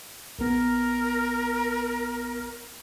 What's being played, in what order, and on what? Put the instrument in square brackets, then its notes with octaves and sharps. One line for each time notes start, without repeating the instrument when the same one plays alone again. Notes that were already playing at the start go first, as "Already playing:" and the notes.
[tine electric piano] A#1 B3 [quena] A#4